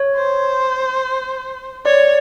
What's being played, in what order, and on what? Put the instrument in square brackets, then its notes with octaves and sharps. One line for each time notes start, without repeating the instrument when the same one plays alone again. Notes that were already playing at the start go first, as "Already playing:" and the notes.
Already playing: [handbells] C#5
[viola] C5
[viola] C#5 [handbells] D5